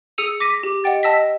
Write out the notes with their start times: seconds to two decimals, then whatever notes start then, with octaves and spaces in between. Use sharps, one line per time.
0.18 G#4 D#6 E6 C#7 D#7 F7
0.40 D6 A#6 B6 D#7
0.63 G4
0.84 D#5 F#5 G5 A6
1.03 D#5 A5 E6 A#6 B6